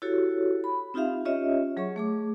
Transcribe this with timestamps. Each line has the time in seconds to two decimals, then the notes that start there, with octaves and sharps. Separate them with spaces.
0.02 E4 F#4 G4 A4 C#5
0.64 B5
0.94 C4 D#4 F4 G4 E5 F5
1.25 C#4 F4 G4 C#5 D#5 E5
1.77 F#3 G#4 C#5 E5 C#6
1.96 A3 G#4 D6